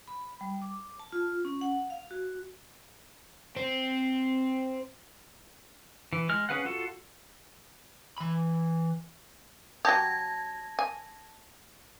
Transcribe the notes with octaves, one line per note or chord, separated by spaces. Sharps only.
B5
G3
D6
A5
F4
C#4
F#5
F5
F#4
C4
E3
G#3 F6
C#4 G#4 B4 F5 F#5
F4 F#4 A4
E3 B5
F#3 G4 A5 G#6 A#6
G#5